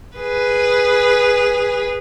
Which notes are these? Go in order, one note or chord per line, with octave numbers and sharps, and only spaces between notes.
G#4 B4